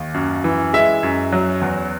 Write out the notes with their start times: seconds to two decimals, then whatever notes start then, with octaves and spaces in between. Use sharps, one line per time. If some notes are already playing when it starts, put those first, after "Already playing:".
Already playing: D#2
0.14 F#2
0.44 E3
0.73 G#3 E5
1.03 F#2
1.32 F#3
1.61 E2